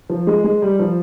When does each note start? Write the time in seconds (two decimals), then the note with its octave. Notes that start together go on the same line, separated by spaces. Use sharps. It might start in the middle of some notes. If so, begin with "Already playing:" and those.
0.09 F3
0.27 G#3
0.44 G#3
0.62 G3
0.79 F3